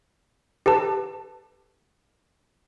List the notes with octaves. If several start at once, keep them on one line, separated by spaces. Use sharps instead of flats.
G4 A4 B4 A5